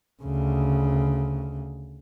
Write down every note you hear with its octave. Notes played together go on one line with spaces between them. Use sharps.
D2 C#3